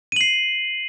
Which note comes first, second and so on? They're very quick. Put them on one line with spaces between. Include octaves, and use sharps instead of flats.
D#7 F#7 C7